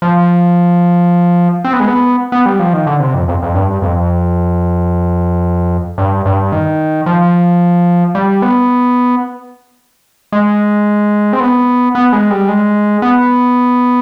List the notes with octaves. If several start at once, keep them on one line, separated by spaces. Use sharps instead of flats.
F3
C4
B3
G#3
B3
B3
G3
F3
D#3
D3
C3
F2
F2
F2
G2
F2
G2
G2
D#3
F3
G3
B3
G#3
C4
B3
B3
G#3
G3
G#3
B3